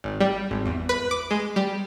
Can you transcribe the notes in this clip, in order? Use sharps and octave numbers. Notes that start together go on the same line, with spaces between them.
G#1
G3
G#1
E2
B4
D6
G#3
G3